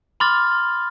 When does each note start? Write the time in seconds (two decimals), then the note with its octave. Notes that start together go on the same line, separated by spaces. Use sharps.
0.20 B5 C6 D6 F6 A6